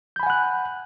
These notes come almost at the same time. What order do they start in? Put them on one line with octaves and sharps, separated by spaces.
G6 B5 G#5 F#5 F#6